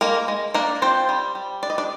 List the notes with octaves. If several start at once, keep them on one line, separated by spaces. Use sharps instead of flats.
G#3 A#3 A#4
G#3
A#3 D4 A#4
C4 F4 C5
G3
G3
D4 D5
D#5
D4 D5